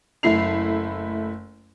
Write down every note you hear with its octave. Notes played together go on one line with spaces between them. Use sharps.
F#1 A3 E4 C7 F7